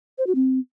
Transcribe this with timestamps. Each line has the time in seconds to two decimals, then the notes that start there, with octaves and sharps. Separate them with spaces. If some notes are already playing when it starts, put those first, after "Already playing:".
0.18 C5
0.27 F#4
0.35 C4